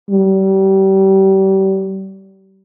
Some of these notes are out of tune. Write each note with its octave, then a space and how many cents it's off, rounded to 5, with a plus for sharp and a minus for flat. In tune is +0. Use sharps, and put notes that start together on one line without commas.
G3 -30